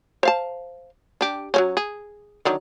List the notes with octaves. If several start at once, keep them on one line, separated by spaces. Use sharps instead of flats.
C5 F5 A5
D4 G4
F#3 A3 C#4
G#4
D3 D#3 F#3